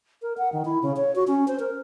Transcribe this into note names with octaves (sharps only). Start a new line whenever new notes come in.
A#4
F#5
D#3
E4
C#3
C#5
F#4
C#4
C5
A#4